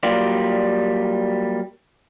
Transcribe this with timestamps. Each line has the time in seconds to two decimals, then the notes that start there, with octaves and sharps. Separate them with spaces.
0.03 F#3 G3 A#3 F4 G4 D5